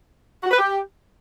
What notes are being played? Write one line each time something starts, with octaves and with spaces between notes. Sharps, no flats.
F#4
B4
G4